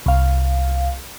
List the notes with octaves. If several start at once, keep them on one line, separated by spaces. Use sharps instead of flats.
C2 F5